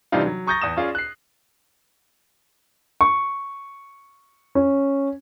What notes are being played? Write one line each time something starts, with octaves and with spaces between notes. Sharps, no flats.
C3 E3 G3 D4 D#4 F4
F#3
A#5 C#6 D#6 G6 A6 A#6
E2 D#6 E7
C#4 F4 G#4 D5
F#6 C7
C#6
C#4